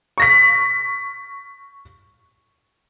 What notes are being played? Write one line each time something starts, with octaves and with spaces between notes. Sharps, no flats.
C#6 A#6 B6